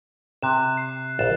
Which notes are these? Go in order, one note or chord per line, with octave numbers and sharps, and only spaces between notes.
C3 F#6 E7
C7
A#1 F5 A6 E7